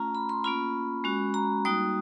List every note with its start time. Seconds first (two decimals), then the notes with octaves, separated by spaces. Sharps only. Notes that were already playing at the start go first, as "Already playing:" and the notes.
Already playing: A3 C#4 F4 A#5
0.15 B5
0.29 C6
0.44 A#3 C#4 F4 B5
1.04 G#3 C#4 F#4
1.34 A#5
1.65 G3 A#3 D#4 F#4 D#6